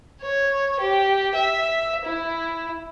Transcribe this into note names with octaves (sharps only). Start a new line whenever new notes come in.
C#5
G4
E5
E4